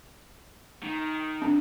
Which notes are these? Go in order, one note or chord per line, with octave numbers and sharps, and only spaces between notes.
D#3
C4 D4